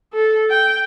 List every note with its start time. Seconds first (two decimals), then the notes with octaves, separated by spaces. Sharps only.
0.13 A4
0.51 G5